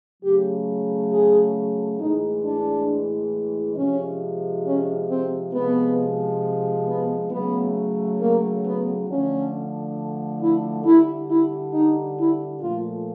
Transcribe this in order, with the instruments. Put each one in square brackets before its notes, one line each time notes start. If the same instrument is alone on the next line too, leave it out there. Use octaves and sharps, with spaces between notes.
[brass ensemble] C#3 F#3 A3 G4
G#4
A2 E3 G#3 D#4
D4
C3 F3 G#3 C#4
C#4
C4
C3 F3 G#3 B3
B3
C#3 F#3 A3 B3
A#3
B3
D3 F3 A3 C#4
E4
D3 G3 E4
E4
D#4
E4
A#2 F3 A3 F4